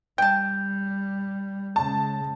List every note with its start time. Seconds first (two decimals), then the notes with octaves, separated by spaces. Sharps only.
0.18 G3 G5 A5 G6
1.76 C#3 G#3 A5